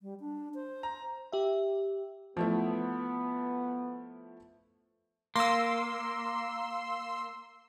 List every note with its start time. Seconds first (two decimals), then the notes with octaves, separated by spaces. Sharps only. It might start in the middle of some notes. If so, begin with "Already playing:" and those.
0.02 G3
0.20 D4
0.55 C5
0.83 A#5
1.32 G4 E5
2.37 F3 A3 B3 E4
5.36 A#3 C6 E6